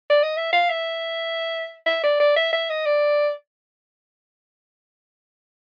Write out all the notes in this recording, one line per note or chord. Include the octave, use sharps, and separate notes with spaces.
D5
D#5
E5
F5
E5
E5
D5
D5
E5
E5
D#5
D5